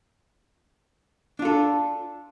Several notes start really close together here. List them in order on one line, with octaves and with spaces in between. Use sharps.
D4 F4 A4